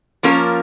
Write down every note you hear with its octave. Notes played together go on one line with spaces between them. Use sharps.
F3 A#3 C#4 F4 A#4